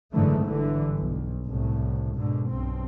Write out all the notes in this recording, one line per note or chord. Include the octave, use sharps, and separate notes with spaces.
F#1 G#2 D3 E3 A3
G1 D3 E3
B1
C2 A2
G#2 B2 D3
B1 G2 C4